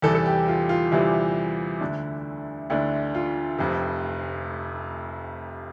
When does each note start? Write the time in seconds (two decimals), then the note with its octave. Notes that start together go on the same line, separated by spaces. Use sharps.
0.02 E2 C3 E3 G3 A4
0.15 A4
0.26 G4
0.48 F4
0.69 F4
0.92 E2 C3 E3 G3 E4
1.81 D2 D3 A3 D4
2.70 D2 D3 A3 D4 E4
3.15 F4
3.59 F1 F2 C3